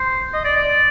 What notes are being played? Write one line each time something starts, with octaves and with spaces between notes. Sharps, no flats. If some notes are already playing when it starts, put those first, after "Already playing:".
Already playing: C5
D#5
D5
D5